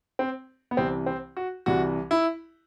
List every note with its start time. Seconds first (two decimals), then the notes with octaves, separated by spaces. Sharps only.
0.19 C4
0.71 B3
0.77 C2 C3 E3 C4
1.06 C4
1.37 F#4
1.66 C2 C3 E3 F#4
2.11 E4